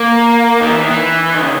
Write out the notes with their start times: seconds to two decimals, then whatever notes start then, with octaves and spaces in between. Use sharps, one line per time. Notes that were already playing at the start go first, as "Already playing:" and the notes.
Already playing: A#3
0.61 D#3
0.71 E3
0.81 D#3
0.91 E3
1.34 D#3
1.41 C#3